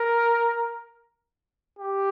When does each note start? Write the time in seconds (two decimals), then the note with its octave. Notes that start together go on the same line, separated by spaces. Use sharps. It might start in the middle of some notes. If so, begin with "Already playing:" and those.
Already playing: A#4
1.79 G4